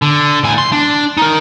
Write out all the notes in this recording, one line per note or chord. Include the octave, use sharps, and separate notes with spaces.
D3
A2 G#5
C6
D4
D#4 A#4